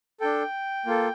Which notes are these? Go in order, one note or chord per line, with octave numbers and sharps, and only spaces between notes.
D4 A4 G5
A#3 F4 A4